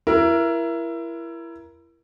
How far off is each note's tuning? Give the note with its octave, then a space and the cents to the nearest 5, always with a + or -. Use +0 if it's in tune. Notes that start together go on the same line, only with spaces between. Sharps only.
E4 +25 A#4 +20